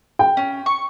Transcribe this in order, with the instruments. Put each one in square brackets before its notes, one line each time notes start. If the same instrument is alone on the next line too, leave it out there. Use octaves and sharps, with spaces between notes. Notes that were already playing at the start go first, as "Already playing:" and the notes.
[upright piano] G5
[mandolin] C#4
C#6